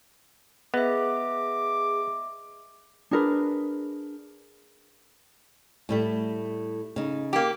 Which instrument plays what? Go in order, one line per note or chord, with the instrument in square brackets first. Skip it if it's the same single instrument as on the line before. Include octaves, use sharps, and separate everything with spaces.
[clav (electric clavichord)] B3 [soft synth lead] G#4 [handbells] D#5 E5 [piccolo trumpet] D6
[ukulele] D4 G#4 A#4 B4
[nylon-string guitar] A2 G3 A3
C#3 D#4
[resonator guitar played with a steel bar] A#3 G4